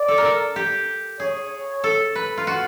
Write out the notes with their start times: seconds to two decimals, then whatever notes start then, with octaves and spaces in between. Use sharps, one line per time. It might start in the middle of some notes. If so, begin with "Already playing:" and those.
Already playing: D5
0.08 A4
0.18 A#4
0.25 A4
0.56 G4
1.20 G#4 C#5
1.84 A4
2.16 B4
2.38 F4
2.47 F#4